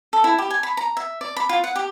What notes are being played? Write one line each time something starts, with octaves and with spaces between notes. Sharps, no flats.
A4
E4
G4
G#5
B5
A#5
E5
D5
B5
F4
F#5
G4